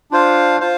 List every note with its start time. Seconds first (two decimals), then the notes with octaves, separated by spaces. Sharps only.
0.11 D4 F4 C5 F5
0.60 F4 C5 F5